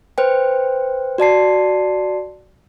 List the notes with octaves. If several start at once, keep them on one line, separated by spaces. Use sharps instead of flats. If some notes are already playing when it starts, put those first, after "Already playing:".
B4 C5 G5
F#4 D5 A5 C7